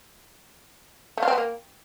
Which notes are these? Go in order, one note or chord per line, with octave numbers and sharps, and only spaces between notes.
A3
F4
C4
B3
A#3